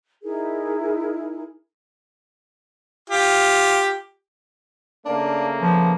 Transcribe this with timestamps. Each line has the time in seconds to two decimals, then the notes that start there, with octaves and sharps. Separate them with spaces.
0.23 D#4 E4 G#4 A#4
3.10 F4 G4
5.06 C#3 A3 A#3 D4
5.62 F3 B3